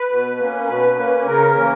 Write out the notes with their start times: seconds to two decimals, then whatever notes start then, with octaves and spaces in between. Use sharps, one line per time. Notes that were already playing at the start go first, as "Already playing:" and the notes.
Already playing: B4
0.11 B2
0.40 A#3 C#4
0.68 B2 B4
0.97 A#3 C#4
1.26 C#3 A#4
1.55 E3 A#3 C#4